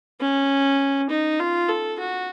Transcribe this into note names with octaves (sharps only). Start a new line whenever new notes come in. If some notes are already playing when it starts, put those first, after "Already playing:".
C#4
D#4
F4
A4
F#4